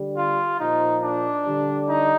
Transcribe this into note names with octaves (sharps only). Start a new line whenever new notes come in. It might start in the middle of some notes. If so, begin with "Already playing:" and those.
Already playing: D3 G3
F4
A#2 F3 D#4
D4
D3 G3
D#4